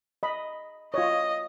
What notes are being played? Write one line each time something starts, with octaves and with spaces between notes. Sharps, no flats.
D#5 B5
F4 C#5 D#5